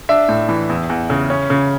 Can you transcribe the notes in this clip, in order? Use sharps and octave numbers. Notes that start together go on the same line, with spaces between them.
D4 E5
A2
E3
E2
E2
C#3
C#4
C#3